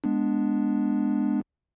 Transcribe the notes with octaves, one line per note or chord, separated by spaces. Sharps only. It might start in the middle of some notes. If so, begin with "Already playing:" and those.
G#3 B3 D4